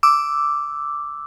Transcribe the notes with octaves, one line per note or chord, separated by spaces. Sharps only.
D6 E6